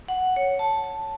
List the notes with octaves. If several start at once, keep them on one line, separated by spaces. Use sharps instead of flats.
F#5
C#5
A5
A5